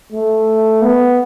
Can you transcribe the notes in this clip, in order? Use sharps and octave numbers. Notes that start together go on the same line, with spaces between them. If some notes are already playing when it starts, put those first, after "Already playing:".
A3
B3